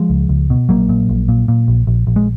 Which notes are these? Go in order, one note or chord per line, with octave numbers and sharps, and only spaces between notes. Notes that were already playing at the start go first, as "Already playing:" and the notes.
Already playing: F3 G#3
C#2
C#2
B2
A#1 F#3 A#3
A#2
A#1
A#2
A#2
A#1
A#1
A#1
G#3